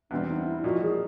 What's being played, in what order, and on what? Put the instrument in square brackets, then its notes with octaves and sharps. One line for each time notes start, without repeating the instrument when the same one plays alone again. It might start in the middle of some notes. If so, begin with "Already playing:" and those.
[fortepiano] E2 B2 G3 C4 [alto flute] D4
[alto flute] D#4
E4
[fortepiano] A#2 F3 A#3 D#4 [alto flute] F#4
[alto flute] G#4